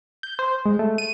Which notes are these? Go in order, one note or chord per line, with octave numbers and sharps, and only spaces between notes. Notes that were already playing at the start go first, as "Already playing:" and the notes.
G6
C5
G#3
A3
D#7